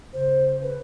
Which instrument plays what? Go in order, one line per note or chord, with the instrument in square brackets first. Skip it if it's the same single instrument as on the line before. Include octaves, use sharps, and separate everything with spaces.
[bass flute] C#3 [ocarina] C5
[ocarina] B4